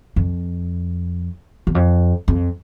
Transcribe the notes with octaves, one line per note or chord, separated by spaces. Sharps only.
F2
E2
F2
F2